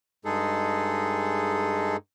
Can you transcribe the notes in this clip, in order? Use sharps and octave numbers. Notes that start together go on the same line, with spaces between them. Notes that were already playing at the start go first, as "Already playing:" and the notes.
G2 G#3 D#4 G#4 A4